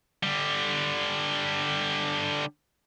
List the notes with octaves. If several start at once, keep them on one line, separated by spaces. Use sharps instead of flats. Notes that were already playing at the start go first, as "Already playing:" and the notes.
D3 G3